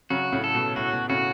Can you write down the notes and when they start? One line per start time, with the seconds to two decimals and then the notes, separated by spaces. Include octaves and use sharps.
0.10 C#3 F#3 F#4
0.32 A2 C#3
0.44 A4
0.55 B2
0.76 A2 F#4
0.93 B2
1.09 A2 C#3 F#4